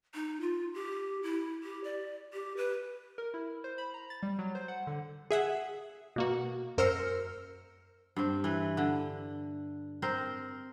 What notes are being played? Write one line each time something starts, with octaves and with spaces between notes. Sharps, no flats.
D#4
F4
G4
E4
G4
D5
G4
B4
A#4
E4
C5
B5
A#5
A6
G3
F#3
C5
F#5
D3
G#4 E5 F#5
B2 A#3 F#4
F#2 A#4 C5 E6 F6 C#7
G2 C4
E3 B4
D3
C4 A#4 C5